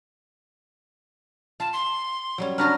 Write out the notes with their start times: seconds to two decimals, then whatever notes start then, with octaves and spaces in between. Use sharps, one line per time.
1.60 F4 A5
1.73 C6
2.38 F#3 G3 C#4
2.58 C#4 D4 F#4 B4 A#5 F6